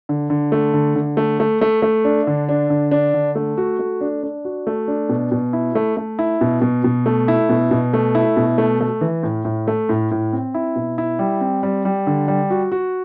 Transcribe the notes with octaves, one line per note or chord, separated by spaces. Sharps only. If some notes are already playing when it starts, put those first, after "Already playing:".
D3
D3
A3
D3
D3
A3
A3
A3
A3
D4
D3
D4
D3
D4
D3
A3
F#4
A3
D4
D4
F#4
A3
D4
B2
B2
E4
A3
A3
E4
B2
B2
B2
A3
E4
B2
B2
A3
E4
B2
A3
A3
E3
A2
A2
A3
A2
A2
C4
E4
B2
E4
G3
C4
G3
G3
D3
G3
F#4
F#4